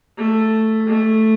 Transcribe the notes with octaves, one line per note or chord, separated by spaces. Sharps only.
A3
A3